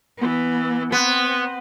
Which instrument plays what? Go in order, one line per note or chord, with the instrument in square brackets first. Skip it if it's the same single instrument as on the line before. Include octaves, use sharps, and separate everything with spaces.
[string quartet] E3 B3
[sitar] B3 [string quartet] C4 C5